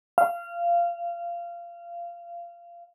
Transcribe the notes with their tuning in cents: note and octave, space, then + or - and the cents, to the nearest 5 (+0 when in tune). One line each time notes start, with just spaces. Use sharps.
F5 -20